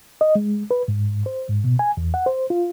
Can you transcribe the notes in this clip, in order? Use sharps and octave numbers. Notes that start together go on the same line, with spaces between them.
D#5
G#3
B4
G#2
C5
G#2
B2
G#5
E2
F#5
C5
F4